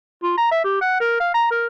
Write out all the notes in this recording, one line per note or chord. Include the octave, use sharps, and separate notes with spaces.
F4
A#5
E5
G4
F#5
A#4
F5
A#5
A#4